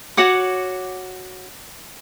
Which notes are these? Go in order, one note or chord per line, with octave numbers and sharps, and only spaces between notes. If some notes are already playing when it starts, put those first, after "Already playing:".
F#4 C#5 F#5 D6